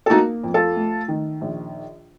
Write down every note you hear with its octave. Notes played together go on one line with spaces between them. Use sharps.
A4
A#3 D#4 F#4
F2
F4 A4
A3
D#3
A#1